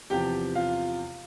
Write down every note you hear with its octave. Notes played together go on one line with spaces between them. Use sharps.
E2 C3 F3 G4 G5
F4 F5